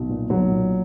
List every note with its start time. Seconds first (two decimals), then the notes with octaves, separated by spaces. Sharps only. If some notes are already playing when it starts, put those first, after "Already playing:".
Already playing: B1
0.09 A#2
0.30 B1 F#3
0.51 A#2